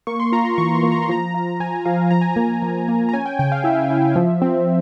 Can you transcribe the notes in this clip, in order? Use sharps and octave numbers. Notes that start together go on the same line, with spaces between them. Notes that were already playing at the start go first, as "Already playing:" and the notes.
A#3 C#6
C6
F4 A#5
C6
E3 C#6
C6
A#3
A#5
C6
F3 A#5
F4
F3 G#5
F3 F5
F3 A#5
G#5
A#3 A#5
F3
A#3
A#5
C#4 G#5
G5
C#3 G5
F5
E4 E5
E4
F3
C4